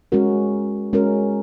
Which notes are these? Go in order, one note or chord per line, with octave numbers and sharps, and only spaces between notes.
G#3 C#4 F#4 A#4
G#3 C#4 F#4 A#4